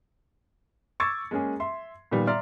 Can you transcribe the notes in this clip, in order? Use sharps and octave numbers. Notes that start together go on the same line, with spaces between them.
C#6 D6 E6 G#6 A6 C#7
G#3 A#3 C#4 G#4
E5 C6
A#2 D#3 G3 B3
D5 E5 A#5 C6 F6